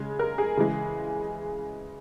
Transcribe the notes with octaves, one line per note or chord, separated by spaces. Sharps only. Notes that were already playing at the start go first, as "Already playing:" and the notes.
Already playing: C#3 G#3
A#4
G#4
C#3 E3 G#3